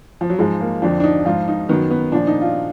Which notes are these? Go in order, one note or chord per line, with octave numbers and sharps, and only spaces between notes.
F3
F#3
G#2 F3 G#3
A#3
F2 D3 F3 D4
D4
D#4
G#2 F3 F4
D#4
F#2 D#3 B3
B3
A#2 F3 D4
D#4
F4